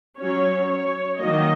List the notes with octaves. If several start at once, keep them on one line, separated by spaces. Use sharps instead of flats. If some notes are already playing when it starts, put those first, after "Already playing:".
F#3 C#4 C#5
C#5
D#3 F#3 A#3 D#5